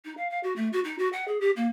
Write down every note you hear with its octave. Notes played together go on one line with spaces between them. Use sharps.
D#4
F5
F5
F#4
A3
F#4
D#4
F#4
F#5
G#4
G4
A#3